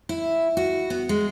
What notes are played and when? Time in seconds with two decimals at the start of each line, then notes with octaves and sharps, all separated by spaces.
0.09 E4
0.57 F#4
0.90 B3
1.09 G#3